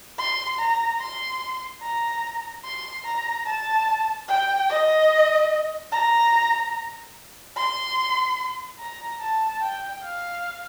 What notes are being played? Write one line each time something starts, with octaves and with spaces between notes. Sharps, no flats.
C6
A#5
C6
A#5
C6
A#5
A5
G5
D#5
A#5
C6
A#5
A5
G5
F5